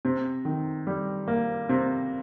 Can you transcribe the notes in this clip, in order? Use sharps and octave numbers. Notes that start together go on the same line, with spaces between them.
C3
D#3
G3
A#3
C3